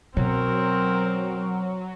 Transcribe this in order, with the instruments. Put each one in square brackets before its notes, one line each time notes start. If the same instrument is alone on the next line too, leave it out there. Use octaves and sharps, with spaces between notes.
[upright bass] B2 [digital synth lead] F#3 [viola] C4 A#4